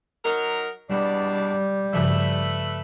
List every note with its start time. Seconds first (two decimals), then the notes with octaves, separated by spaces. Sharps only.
0.25 F#3 D#4 A#4
0.90 E2 B2 G3 D4
1.93 G2 C#3 F3 A3 B4 E5